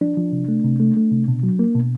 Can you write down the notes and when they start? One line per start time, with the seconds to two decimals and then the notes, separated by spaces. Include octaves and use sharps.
0.01 F3 D4
0.17 F3
0.32 C3
0.48 A3
0.64 C3
0.80 A3
0.97 A3
1.12 C3
1.28 B2
1.43 F#3
1.59 A#3
1.75 B2